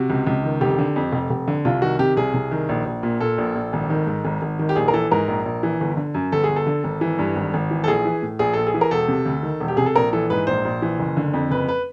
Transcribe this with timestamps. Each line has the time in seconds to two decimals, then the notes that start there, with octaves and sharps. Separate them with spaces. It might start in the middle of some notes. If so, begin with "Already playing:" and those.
Already playing: C3 F#4
0.10 C#2
0.27 C#2
0.44 D#3
0.61 F1 G4
0.79 D3
0.96 F2
1.12 F1
1.30 F1
1.48 D3
1.65 C2 F4
1.82 D#3 F#4
1.99 C3 G4
2.17 C2 G#4
2.34 C2
2.51 D#3
2.69 A#1
2.86 A#1
3.03 A#2
3.20 A#2 A4
3.38 A#1
3.55 A#1
3.73 G#1
3.90 D#3
4.07 G#2
4.25 G#1
4.42 G#1
4.59 D#3
4.69 G4
4.76 A#1 G#4
4.88 A#4
4.93 E3 A4
5.11 G#2 A#4
5.28 A#1
5.46 A#1
5.63 E3
5.81 G1
5.97 D3
6.14 F#2
6.32 G1 A4
6.44 G#4
6.49 G1
6.56 A4
6.67 D3
6.84 G#1
7.01 E3
7.19 G2
7.36 G#1
7.54 G#1
7.71 E3
7.84 A4
7.87 A#1 G#4
8.05 E3
8.23 A2
8.39 A#1 G#4
8.53 A#1 A4
8.67 G#4
8.74 E3
8.81 A#4
8.91 E1 A4
9.08 C3
9.26 D2
9.43 D#3
9.60 E1
9.68 G4
9.77 C3 G#4
9.86 A4
9.95 A#1 A#4
10.13 E3 A4
10.30 G#2 B4
10.47 A#1 C5
10.65 A#1
10.82 E3
10.99 F#1
11.17 D3
11.34 F2
11.51 F#1 B4
11.68 B4